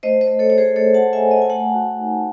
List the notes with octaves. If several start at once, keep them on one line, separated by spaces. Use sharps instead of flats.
A3 C5 D#5
C5 D#5
A3
A4 C#5
A3 C#5
G#4 C5
A3 A4 C#5
F#5 A5
A3
E5 G#5
A3
D#5 F#5
G#5
A3 F#5 A5
F#4
D#4